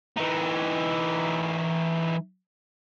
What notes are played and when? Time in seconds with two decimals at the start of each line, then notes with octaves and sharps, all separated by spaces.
0.17 E3 D#4